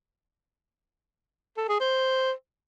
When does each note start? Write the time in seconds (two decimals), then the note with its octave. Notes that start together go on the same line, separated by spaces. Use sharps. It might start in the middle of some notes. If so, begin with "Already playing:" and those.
1.57 A4
1.68 G#4
1.80 C5